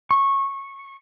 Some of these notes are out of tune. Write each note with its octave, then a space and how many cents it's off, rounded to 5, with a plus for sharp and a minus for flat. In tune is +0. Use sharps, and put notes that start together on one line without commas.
C#6 -15